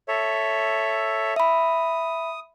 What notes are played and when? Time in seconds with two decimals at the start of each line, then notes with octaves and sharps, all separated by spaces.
0.08 A4 C#5 E5
1.36 E5 B5 D#6